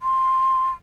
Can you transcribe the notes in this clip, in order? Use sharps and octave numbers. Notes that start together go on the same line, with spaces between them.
C6